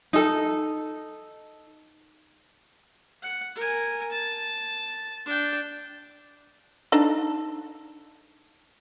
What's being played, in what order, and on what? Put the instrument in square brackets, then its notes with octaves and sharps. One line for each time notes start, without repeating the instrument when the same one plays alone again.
[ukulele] D#4 A4
[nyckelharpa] F#5
A#4 G#5
A5
D4 G5
[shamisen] D4 D#4 A4